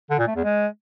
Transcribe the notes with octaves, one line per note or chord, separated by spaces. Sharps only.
D3
A#2
A3
E2
G#3